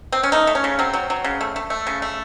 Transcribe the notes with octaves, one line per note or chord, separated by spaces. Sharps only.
C4
C#4
A3 D#4
A3
C#4
C#3
F#3 C4
F#3
F#3
C#3
A3
A3
A3
C#3
A3